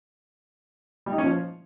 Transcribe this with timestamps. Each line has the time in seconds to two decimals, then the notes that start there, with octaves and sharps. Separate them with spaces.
1.06 G3
1.12 D#4
1.18 C#4
1.24 F3